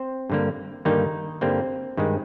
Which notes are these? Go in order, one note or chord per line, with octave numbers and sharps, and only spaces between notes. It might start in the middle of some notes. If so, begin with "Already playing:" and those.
Already playing: C4 C5
G2 D3 G3 A#3
G2 D3 D#3 G3 A#3 D#4
G2 D3 G3 A#3 C4
G2 D#3 G#3